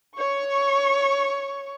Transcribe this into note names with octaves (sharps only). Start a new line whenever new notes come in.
C#5 C#6